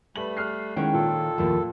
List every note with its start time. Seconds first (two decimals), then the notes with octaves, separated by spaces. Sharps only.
0.16 G3 A3 B4 F#7
0.37 F6 F#6 C7
0.76 D#3 G#3 C#4 E4 C#5 F#5 G5
0.93 A#2 A4
1.38 D#2 A2 F3